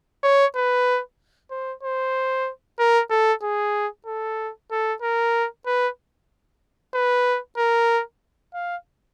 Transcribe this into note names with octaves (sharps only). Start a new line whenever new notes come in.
C#5
B4
C5
C5
A#4
A4
G#4
A4
A4
A#4
B4
B4
A#4
F5